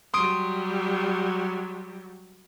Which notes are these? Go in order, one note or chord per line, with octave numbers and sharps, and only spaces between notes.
F#3 G3 C6 D#6 D7